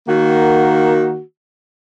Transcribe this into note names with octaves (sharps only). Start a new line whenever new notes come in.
D#3 A#3 F#4